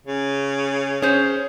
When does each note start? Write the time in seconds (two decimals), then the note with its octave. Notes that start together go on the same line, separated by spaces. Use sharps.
0.07 C#3
1.02 C#4 G#4 C5 C#5